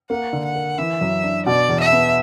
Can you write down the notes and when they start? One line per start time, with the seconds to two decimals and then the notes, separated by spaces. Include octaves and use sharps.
0.10 A#3 F#5
0.33 D3
0.45 F#5
0.56 A#4
0.78 E3 E5
1.01 F#2
1.23 D4
1.46 B2 D5
1.69 E2
1.81 E5
1.92 B3